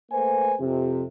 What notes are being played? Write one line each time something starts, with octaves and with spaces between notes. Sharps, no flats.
A3 A#3 B4 C5 G#5
F2 C3